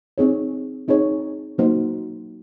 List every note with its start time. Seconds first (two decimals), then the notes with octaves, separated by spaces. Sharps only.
0.18 C4 D#4 G#4 C#5
0.88 C4 D#4 G#4 C#5
1.58 F#3 A#3 D#4 F#4 C5